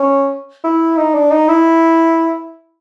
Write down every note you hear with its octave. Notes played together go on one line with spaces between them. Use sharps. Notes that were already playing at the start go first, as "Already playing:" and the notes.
Already playing: C#4
E4
D#4
D4
D#4
E4